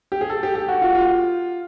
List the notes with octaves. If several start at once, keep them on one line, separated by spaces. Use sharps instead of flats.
G4
G#4
A4
G4
G4
F#4
F4
F4